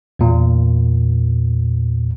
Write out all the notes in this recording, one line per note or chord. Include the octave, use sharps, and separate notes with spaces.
E2 A#2